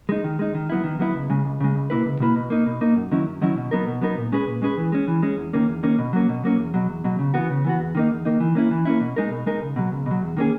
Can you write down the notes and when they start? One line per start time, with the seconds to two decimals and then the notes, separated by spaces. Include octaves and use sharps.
0.09 G#3 D#4
0.24 D#3
0.39 G#3 D#4
0.55 D#3
0.70 F#3 B3 E4
0.84 D#3
0.99 F#3 B3 E4
1.15 C#2
1.30 C#3 G#3
1.45 C#2
1.60 C#3 G#3
1.75 C#2
1.90 B2 A#3 E4 B4
2.05 C#2
2.20 B2 A#3 E4 B4
2.35 B2
2.50 A#3 D#4
2.66 B2
2.81 A#3 D#4
2.96 F#2
3.11 D#3 F#3 C#4 E4
3.26 F#2
3.41 D#3 F#3 C#4 E4
3.56 B2
3.71 F#3 B3 D#4 A#4
3.87 B2
4.01 F#3 B3 D#4 A#4
4.17 A#2
4.32 G#3 C#4 G#4 B4
4.47 A#2
4.62 G#3 C#4 G#4 B4
4.77 E3
4.92 G#3 C#4
5.08 E3
5.22 G#3 C#4
5.38 E2
5.53 D#3 A#3 C#4
5.68 E2
5.83 D#3 A#3 C#4
5.98 B2
6.13 F#3 A#3 C#4
6.29 B2
6.43 F#3 A#3 C#4
6.59 E2
6.74 B2 F#3
6.89 E2
7.04 B2 F#3
7.19 C#3
7.34 E3 B3 F#4
7.50 C#3
7.65 E3 B3 F#4
7.79 E2
7.95 D#3 A#3 D#4
8.11 E2
8.25 D#3 A#3 D#4
8.40 E3
8.55 A#3 C#4 E4
8.71 E3
8.85 A#3 C#4 E4
9.01 B2
9.16 G#3 D#4 A#4
9.31 B2
9.46 G#3 D#4 A#4
9.61 C#2
9.76 B2 F#3
9.92 C#2
10.06 B2 F#3
10.22 E2
10.37 D#3 A#3 C#4 G#4